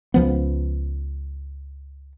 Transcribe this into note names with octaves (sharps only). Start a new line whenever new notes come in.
C#2 F3 B3